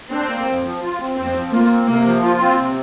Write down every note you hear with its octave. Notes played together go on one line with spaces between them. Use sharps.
C4 D4
A#3
F2
F3
F4
C4
F2 C4
F3
A#3 F4
C4
C3 A#3
F3
F4
C4
C3